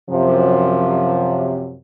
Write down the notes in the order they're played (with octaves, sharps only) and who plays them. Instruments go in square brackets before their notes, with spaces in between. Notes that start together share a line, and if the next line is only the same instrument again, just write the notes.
[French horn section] F#2 C3 F3